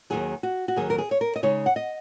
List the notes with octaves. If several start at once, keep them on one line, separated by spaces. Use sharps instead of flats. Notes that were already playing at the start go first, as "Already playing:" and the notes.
D#2 D#3 F#3 G#4
F#4
F#4
D#2 D#3 F#3 G#4
A#4
G#4
C#5
A#4
D#5
C#3 G#3 D#4 C#5
F#5
D#5